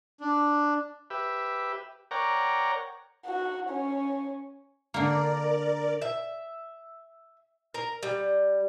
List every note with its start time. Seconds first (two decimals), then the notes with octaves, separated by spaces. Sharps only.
0.20 D4
1.10 G4 B4 E5
2.11 A#4 C#5 D5 F#5 G5 A#5
3.26 F#4
3.69 C#4
4.94 D3 A#3 A#4 D5
6.02 E5
7.74 A#4
8.03 G3